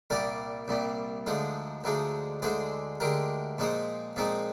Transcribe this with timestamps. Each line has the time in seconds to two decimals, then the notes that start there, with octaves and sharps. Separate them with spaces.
0.10 C2 A#2 G3 A#4 D5
0.68 C2 A#2 G3
1.27 D2 D3 F3 G#3 D#4
1.84 D2 D3 F3 G#3 D#4
2.42 D2 D3 G#3 G#4 C5
3.00 D2 D3 G#3 G4 A#4
3.58 A#2 F3 G#3 C4 D#4
4.16 A#2 F3 G#3 C4 D#4